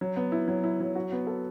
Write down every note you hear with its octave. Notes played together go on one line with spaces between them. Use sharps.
F#3
B3
E4
F#3
E4
F#3
F#4
B3
A4